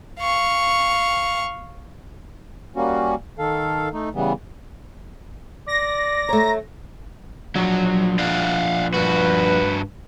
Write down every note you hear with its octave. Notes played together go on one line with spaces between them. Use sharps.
F5 C#6
G3 A#3 C#4 F#4
D#3 A4 F5
A3 D#4
C#3 E3 G3 B3
D5 A#6
A3 C#5 A#5
F3 F#3 D4
D5 F5 F#5
G2 F#4 B4